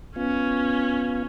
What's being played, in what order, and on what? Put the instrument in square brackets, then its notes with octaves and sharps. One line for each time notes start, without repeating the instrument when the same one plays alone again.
[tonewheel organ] B3 F4 [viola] C#4